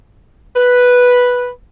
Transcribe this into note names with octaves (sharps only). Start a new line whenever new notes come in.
B4